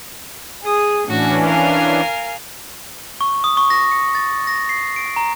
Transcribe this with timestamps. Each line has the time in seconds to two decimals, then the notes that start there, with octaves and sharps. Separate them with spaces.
0.64 G#4 D#6
1.07 A2 E3 C#4 D4 F#4
1.44 A#4 F5 G#5
3.21 C#6
3.44 D#6
3.57 C#6
3.70 A#6
3.91 C#7
4.15 A6
4.47 A#6
4.69 C7
4.96 D7
5.16 A#5